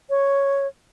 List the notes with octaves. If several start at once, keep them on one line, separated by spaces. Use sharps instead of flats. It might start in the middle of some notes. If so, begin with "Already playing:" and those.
C#5